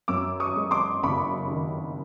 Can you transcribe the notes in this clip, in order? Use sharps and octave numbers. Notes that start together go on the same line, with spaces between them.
F#2 D6 E6
C#6 D#6
G#3
C6 D6
F#1 B5 C#6
D#3